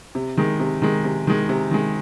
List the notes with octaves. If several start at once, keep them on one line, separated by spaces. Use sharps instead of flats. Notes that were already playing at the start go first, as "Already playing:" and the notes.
C3
D#3 G#3
C3
D#3 G#3
C3
D#3 G#3
C3
D#3 G#3